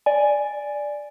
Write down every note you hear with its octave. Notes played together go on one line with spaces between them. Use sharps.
D5 G#5